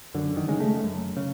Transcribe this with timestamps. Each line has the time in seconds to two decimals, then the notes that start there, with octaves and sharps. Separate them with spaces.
0.14 F#2 D3
0.37 D#3
0.48 C#3 G#3
0.60 A3
0.83 F#2
1.17 C#3